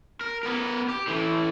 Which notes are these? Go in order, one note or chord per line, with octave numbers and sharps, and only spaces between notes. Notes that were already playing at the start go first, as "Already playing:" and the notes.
A#4
B3 A#4
G4
A2 E3